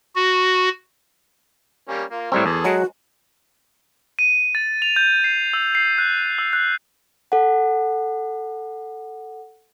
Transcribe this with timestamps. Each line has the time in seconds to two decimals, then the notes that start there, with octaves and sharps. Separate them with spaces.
0.16 F#4
1.89 G3 A#3 C#4
2.11 A#3 F4
2.32 A2 G3 C4 A#4 C#5 E6
2.46 E2 G#4 A4
2.65 F#3 G#3 F#4
4.19 D#7
4.55 A6
4.82 F7
4.96 G6
5.24 C7
5.53 E6
5.75 C7
5.98 F#6
6.38 E6
6.53 F#6
7.32 A4 F#5